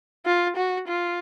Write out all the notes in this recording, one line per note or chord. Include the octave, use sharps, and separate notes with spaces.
F4
F#4
F4